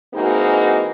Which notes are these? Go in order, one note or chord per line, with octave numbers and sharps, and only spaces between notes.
E3 G#3 A#3 C4 D#4 F#4